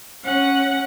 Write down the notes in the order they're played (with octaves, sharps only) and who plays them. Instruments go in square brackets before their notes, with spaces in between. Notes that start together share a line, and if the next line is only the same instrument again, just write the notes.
[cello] C#4 [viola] F#5